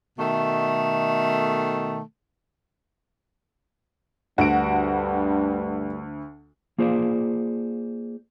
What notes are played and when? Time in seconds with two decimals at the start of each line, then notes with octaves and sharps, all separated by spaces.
0.18 B2 D#3 A3
4.38 D2 G2 F#4 D7
6.78 A#3 F4 G#4 C5 D5